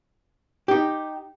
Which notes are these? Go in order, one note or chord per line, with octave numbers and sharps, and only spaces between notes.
D#4 G4